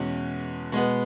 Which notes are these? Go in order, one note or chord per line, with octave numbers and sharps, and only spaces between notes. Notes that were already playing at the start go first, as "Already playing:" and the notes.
Already playing: E2 B2 G#3 C#4
B2 G#3 B3